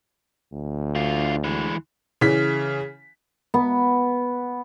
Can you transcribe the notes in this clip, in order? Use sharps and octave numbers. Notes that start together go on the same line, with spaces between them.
D2
D3 F4
E3 G#3
C#3 E3 B6
B3